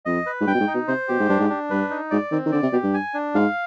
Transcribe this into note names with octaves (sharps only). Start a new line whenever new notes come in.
F2 D#5
B4
G#2
G2 G5
B2
G#2
D#4
B2
C3 C5
B2 G4
G#2
G2 D4
G#2
D4
G2 B4
D#4
G#2 D5
D#3 C4
D#3
D3 D5
C3
B2 G4
G2
G#5
D4
G#2 F5